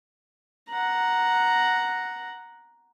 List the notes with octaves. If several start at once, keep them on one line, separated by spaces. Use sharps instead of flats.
F#5 A#5